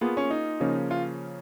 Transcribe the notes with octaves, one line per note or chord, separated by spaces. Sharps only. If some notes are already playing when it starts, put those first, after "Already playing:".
A#3 B3 F4 G#4
C#4
D#4
C#3 F3 A#3 C#4
F4